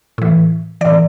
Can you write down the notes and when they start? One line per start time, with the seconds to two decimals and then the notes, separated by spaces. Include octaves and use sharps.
0.18 A2 E3
0.81 A2 E3 D5